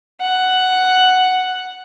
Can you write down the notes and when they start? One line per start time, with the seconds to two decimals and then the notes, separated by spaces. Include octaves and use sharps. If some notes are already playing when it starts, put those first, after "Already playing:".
0.21 F#5